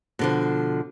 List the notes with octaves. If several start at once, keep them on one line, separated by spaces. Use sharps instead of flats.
B2 D3 F3